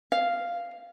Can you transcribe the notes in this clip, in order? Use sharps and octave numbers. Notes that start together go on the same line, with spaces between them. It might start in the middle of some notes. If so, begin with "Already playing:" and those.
F5